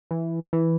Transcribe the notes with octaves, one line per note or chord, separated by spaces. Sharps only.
E3
E3